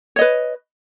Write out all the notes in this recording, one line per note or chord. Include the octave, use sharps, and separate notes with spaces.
B4 C#5 D#5